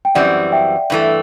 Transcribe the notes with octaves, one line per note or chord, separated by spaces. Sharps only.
G5
F#2 E3 G3 C4 D5 F#5
E5 G5
G2 E3 A3